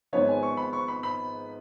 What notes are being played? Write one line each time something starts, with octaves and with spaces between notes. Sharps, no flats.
G#1 G#2 F3 B3 D#4 C#5
G#5
C#6
B5
C#6
B5
B5